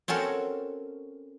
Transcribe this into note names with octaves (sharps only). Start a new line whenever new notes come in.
C4 C#4 F#4 A4 A#4